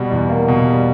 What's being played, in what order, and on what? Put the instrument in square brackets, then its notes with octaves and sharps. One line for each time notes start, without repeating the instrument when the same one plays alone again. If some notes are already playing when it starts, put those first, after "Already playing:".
Already playing: [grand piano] B2 G3
E2
A#3
B2
G3